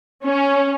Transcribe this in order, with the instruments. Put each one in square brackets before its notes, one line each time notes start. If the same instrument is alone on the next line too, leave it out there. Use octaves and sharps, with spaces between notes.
[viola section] C#4